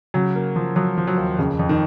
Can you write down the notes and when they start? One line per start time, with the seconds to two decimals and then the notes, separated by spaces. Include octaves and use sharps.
0.14 C#3 F#3
0.36 A#3
0.56 F3
0.76 F3 F#3
0.98 F3
1.07 F#3
1.17 D#2
1.38 F2 C#3
1.59 F2
1.69 D#3